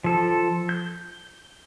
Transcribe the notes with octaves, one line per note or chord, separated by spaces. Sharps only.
F3 A4
G6